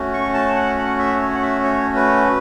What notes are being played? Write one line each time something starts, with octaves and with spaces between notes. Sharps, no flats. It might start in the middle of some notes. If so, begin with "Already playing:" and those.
Already playing: A3 C#4 F#4
C#6
A5
F#5
F#5
E5
C#5
F#5
E5
C#5
B4